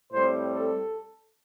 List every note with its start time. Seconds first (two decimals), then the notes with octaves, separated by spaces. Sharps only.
0.12 A2 G3 C4 C5
0.55 A4